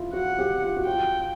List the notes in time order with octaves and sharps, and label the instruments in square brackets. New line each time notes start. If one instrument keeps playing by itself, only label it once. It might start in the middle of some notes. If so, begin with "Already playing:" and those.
Already playing: [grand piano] E4 F4
[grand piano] F#4 [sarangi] F#5
[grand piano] G4
F4
F#4
[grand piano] F4 [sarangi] G5